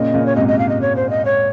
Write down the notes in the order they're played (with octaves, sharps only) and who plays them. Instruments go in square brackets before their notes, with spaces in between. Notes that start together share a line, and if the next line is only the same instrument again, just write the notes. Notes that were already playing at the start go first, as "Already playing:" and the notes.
Already playing: [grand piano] A#2 C#3 [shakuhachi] D#5
[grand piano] A#2 C#3
[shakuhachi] C#5
[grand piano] G#2 C3 [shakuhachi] D#5
[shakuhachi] D#5
F5
D#5
C#5
C5
D#5
C#5